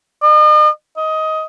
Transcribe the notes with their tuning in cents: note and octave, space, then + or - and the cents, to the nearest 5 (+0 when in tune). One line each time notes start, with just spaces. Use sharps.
D#5 -45
D#5 +15